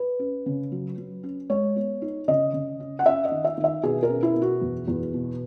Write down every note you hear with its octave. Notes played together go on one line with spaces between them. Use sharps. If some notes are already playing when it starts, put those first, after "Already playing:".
Already playing: B4
C#4
C#3
F#3
F#3
C#4
G#3 C#5
B3
D#4
C#3 D#5
C#3
C#4
F#5
C#4 E5
D#5
D#3
E5
D#3
E5
B2 G#4
A#4
C#4
E4
B2
F#4
E2
E2
B2